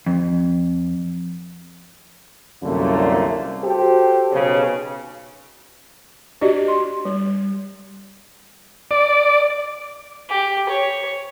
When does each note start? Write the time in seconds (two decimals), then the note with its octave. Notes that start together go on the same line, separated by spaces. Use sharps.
0.06 F2
2.62 C2 F#2 A#2 D3 A3 A#3
3.63 F#4 G4 A4 C5
4.32 B1 C#3
6.41 D4 F#4 G4 D5 D#5
6.68 C6
7.05 G3
8.91 D5
10.29 G4
10.69 C#5